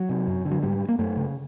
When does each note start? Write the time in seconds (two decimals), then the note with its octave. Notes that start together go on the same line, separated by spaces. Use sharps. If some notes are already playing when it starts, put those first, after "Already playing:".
Already playing: F#3
0.09 C3
0.27 F#2
0.45 D3
0.51 F#3
0.63 G#2 G3
0.89 A#3
0.99 F#2 A3
1.17 C#3